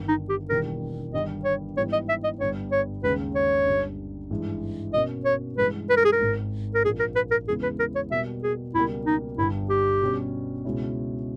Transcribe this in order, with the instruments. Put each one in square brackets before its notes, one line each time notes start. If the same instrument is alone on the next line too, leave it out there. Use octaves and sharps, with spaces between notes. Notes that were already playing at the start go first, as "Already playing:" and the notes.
Already playing: [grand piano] G1 G2 D#3
[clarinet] D#4
G4
[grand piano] E1 E2 D#3 G3 A#3 [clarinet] A#4
[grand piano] G1 G2 D#3 G3 [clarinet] D#5
[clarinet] C#5
[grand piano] G#2 E3 G3 B3 [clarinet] C#5
[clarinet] D#5
E5
D#5
[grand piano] G1 G2 G3 B3 G4 [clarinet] C#5
[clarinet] C#5
[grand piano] D#2 C#3 G#3 C#4 [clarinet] B4
[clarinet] C#5
[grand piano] G1 G2 G3
G#1 G2 E3 G#3
[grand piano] B2 A#3 C#4 [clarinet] D#5
[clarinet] C#5
[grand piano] G2 E3 G#3 [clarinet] B4
[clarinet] B4
A#4
G#4
A#4
[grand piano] G#1 G#2 D#3
[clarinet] A#4
[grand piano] A#1 A#2 A#3 [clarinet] G#4
[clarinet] A#4
B4
A#4
[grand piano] E2 C#3 E3 G#3 B3 [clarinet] G#4
[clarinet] B4
A#4
C#5
[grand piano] B2 G3 A#3 [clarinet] E5
[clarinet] G#4
[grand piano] C#2 B2 G3 A#3 [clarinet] E4
[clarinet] D#4
[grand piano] G1 G2 G3 [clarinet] E4
[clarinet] G4
[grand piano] B2 G3 C#4
C#2 B2 G#3 C#4 E4